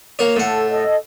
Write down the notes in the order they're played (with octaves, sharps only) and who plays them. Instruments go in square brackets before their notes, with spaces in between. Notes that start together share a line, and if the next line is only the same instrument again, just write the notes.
[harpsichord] A#3 C#5
[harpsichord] A2 F#5 [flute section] A4
[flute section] A4 D#5